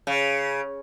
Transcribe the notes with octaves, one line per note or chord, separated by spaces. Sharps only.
C#3